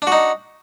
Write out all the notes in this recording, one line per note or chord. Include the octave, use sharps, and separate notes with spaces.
D4 D#4 F#4